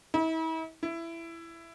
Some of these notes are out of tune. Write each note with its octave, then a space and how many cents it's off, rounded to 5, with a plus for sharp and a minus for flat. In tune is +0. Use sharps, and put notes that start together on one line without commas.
E4 -40
E4 +15